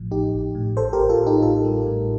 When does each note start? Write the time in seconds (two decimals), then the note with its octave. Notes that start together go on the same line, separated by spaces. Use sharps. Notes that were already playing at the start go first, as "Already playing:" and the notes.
Already playing: A1 A2 F3
0.11 A1 D#4 G4
0.34 A1
0.55 A2
0.77 A1 A4 C5
0.93 G4 A#4
0.99 A1
1.09 F4 A4
1.21 A2
1.26 D#4 G4
1.42 A2 F4 A4
1.64 G3
1.86 A2